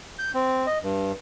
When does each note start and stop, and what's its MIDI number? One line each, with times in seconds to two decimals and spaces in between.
0.19 0.31 91
0.34 0.66 60
0.67 0.78 75
0.83 1.12 43